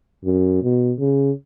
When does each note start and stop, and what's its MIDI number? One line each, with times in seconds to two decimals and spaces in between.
0.25 0.60 42
0.63 0.93 47
0.99 1.32 49